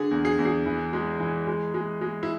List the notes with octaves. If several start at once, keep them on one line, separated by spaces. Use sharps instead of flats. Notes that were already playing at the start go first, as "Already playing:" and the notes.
Already playing: D3 G#4
E2
G#4
E2
G#4
E3
G#3
E3
G#3
G#3
G#3
E4